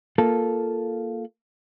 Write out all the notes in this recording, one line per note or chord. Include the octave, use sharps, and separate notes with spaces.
A#3 F4 A4